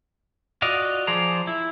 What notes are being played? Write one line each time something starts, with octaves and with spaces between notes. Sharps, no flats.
F4 F#4 D5 D#5 F5
F3 G#4 C5 D5 A#5
E4